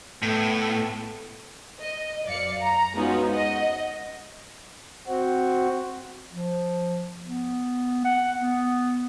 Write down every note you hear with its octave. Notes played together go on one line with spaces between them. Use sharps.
A2 B3 A4
D#5
F#2 D5 F5 C#7
A#5
G#3 B3 C#4 D#4 F4 F#4
D#5 F#5
C4 F#4
F3
B3
F#5
B3